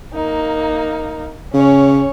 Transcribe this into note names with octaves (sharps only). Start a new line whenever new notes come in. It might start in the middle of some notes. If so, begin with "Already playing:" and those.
A#3 D#4
C#3 C#4 C#5